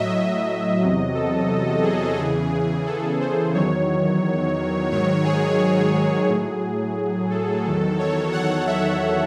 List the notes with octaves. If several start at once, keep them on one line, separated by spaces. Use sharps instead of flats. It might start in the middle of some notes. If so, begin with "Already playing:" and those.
Already playing: A2 F#3 D#5 E5
E2 C3 F#3
A4
G#4
E2 C#3 E3
A4
C5
E2 D#3 F#3 C#5
G#2 D#3 F#3 C#5
G#4
A2 F#3 G#4
A4
E2 D#3 F#3
C#5
F#5
E5